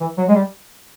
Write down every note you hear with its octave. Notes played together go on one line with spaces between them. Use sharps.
E3
F#3
G#3
G3